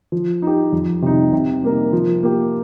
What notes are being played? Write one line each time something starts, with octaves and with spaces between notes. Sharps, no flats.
F3
D#4 G4
F2
C3 G3 D#4
C3
G3 A#3 D#4 A#4
F3
A#3 G4